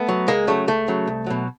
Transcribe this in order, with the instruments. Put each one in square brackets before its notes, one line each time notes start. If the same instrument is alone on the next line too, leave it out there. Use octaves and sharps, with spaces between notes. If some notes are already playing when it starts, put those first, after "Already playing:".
Already playing: [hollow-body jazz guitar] A3 B3
F#3
C#2 G#3 A#3
C#3 F#3 A3
C#2 A3
C#3 F#3
C2
B2 F#3